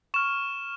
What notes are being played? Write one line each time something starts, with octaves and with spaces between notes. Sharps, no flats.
C#6 F6 E7